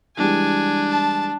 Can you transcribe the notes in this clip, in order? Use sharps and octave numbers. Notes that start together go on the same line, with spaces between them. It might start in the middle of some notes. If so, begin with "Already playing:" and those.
E3 G3 G#3 D4 G#5
A5